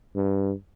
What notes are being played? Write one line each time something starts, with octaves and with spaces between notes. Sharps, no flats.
G2